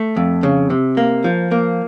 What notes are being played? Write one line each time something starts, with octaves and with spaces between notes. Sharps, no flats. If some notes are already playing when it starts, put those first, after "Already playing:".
Already playing: A3
F2
C#3
C3
A#3
F3
A#3